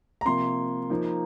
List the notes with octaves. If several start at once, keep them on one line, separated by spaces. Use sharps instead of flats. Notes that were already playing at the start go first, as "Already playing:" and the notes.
A#5
C3 F3 A#3 C6
F3 A#3 D#4